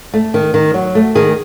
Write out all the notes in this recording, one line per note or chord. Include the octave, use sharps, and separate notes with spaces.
A3
D#3
D#3
F#3
A3
D#3 G#4